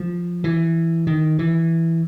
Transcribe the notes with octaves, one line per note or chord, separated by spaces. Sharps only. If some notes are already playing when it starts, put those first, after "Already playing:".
Already playing: F3
E3
D#3
E3